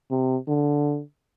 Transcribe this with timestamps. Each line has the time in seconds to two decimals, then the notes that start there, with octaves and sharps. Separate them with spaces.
0.11 C3
0.48 D3